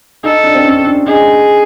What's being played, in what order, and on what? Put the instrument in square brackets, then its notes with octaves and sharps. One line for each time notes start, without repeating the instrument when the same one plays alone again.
[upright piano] D#4 [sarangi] A4
[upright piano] D4
C4
C#4
D4
[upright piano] D#4 [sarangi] G#4